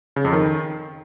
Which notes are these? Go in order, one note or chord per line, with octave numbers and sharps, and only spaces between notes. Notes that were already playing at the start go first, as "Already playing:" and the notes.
C#3
F2
D#3